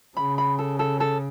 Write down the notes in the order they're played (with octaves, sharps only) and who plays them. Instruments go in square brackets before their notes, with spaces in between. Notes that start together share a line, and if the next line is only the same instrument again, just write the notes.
[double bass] C#3 [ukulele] B5
[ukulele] B5
A4
A4
A4